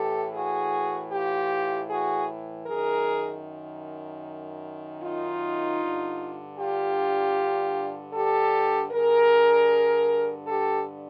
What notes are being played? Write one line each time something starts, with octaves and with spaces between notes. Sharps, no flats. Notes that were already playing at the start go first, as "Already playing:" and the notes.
Already playing: A2 E3 G4 A4
F#4 G#4
F4 G4
F#4 G#4
F#2 D#3 G#4 A#4
D#4 F4
G2 D3
F4 G4
G4 A4
G2 D3 G#4 A#4
G4 A4